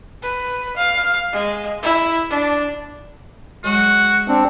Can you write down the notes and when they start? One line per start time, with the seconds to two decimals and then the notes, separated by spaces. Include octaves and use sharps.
0.23 B4
0.77 F5
1.33 G#3
1.83 E4
2.30 D4
3.64 F#3 G#3 F#4
4.28 C4 D4